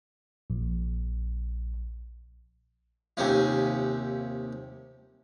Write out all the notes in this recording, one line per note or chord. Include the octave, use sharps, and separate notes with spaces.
A#1
D#2 C3 C#4 F4